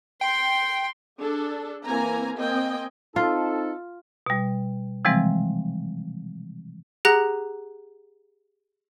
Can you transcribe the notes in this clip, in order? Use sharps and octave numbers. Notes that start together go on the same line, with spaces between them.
G5 C6
D4 G#4 A4
E3 A#3 C4 G#5 A#5
A#3 C4 D#5 G5 G#5
C4 D#4 F4 A4
B2 G3
C3 E3 F3 G3 G#3 C4
G4 G#4 F#5 A#5 F#6 A#6